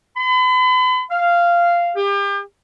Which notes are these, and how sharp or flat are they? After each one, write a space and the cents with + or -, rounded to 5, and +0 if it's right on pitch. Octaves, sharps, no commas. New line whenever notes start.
B5 +40
F5 -10
G4 +35